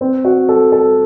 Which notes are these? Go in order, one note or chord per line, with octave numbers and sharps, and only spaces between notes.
C4
F#4
A4
A4